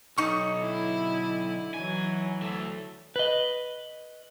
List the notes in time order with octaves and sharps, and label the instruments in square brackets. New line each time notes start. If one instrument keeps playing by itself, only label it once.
[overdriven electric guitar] B1 [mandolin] D#4 C#6
[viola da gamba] D3 E4
[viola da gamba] E3 F#3 [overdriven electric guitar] G#5
[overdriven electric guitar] D2 A3
[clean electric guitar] B4 D#5